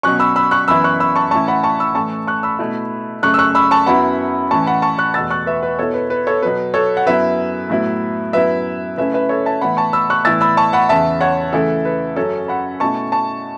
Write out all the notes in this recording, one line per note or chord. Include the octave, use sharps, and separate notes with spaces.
B2 F#3 C#4 C#6 F#6
B5 E6
B5 E6
C#6 F#6
F#2 E3 B3 E4 B5 E6
C#6 F#6
B5 E6
A5 C#6
A2 E3 C#4 E4 A5 C#6
F#5 B5
A5 C#6
B5 E6
A2 E3 A3 C#4 A5 C#6
C#6 F#6
B5 E6
B2 A3 E4
F#2 C#3 A3 C#6 F#6
E6
C#6 F#6
B5 E6
A5 C#6
F#2 F#3 B3 E4 F#5 B5
A2 E3 C#4 A5 C#6
F#5 B5
A5 C#6
C#6 F#6
E2 B2 A3 E6 A6
C#6 F#6
B4 E5
B4
B2 B3 E4 A4 C#5
B4
B4
A4 C#5
B2 F#3 B3 B4
A4 C#5
F#5
F#2 F#3 B3 E4 B4 E5
A2 F#3 B3 E4
F#2 F#3 B3 E4 B4 E5
C#3 A3 C#4 E4 B4 E5
B4 E5
A4 C#5
E5 A5
A2 E3 B3 E4 F#5 B5
A5 C#6
B5 E6
C#6 F#6
A2 E3 B3 E4 E6 A6
B5 E6
A5 C#6
F#5 B5
E2 C#3 E3 E5 A5
C#5 F#5
C#3 E3 A3 E4 A4
B4
F#2 C#3 F#3 C#4 A4 C#5
F#5 B5
B2 A3 C#4 E4 A5 C#6
A5 C#6